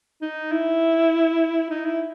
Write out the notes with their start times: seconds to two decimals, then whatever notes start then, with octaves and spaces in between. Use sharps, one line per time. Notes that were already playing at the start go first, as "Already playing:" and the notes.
0.22 D#4
0.52 E4
1.70 D#4
1.86 E4